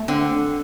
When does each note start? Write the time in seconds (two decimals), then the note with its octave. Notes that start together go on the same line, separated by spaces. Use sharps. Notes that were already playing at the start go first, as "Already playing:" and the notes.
Already playing: A3
0.08 D3 C4